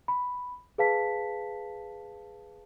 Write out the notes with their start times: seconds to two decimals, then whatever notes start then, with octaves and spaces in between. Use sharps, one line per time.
0.08 B5
0.78 G#4 B4 F5 A5 B6